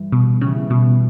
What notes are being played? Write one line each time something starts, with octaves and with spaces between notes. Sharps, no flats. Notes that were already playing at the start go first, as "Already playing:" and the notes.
Already playing: G2 E3 G3
B2
C#3 E3 G3 C#4
B2